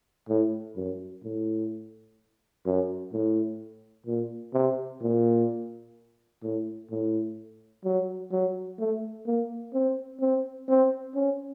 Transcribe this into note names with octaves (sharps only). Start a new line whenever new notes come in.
A2
F#2
A2
F#2
A2
A#2
C3
A#2
A2
A2
F#3
F#3
A3
A#3
C4
C4
C4
C#4